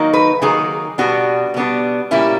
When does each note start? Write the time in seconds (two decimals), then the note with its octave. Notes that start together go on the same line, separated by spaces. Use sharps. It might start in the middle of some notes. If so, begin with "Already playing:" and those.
Already playing: D#3 F#3 A#3 D#4
0.13 B4
0.42 D#3 F#3 A#3 D#4 G#4
0.98 B2 G3 B3 D4 F#4
1.54 B2 G3 B3 D4
2.11 A#2 G3 A#3 C#4 E4